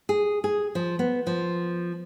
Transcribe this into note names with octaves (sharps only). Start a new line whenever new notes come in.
G#4
G#4
F3
B3
F3